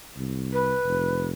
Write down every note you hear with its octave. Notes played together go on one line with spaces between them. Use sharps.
C2
B4
F1